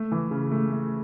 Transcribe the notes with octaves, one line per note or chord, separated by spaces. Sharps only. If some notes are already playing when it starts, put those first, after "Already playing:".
Already playing: A3
E3
C#3
A3
A3